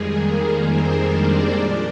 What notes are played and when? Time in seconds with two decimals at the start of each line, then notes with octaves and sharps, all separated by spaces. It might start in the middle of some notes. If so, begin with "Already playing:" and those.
Already playing: F2 D#3 G3 G#3 G#4
0.13 A#3 A#4
0.59 C4 C5
1.05 D4 D5
1.51 A#2 F3 D4 D5